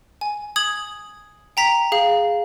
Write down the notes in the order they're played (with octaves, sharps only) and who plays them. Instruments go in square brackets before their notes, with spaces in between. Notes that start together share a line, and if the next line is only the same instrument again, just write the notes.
[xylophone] G#5
D#6 G#6 F#7
G5 A#5 B6
G#4 F5